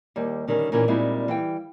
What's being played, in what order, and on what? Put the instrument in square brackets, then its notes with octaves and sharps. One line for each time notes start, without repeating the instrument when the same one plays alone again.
[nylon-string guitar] D#2 G3
D3 D#3 G3 C#4
A#2 D#3 E3 A#3 C#4
A#2 G3 G#3 C4 D#4 E4
E3 G3 F5 G5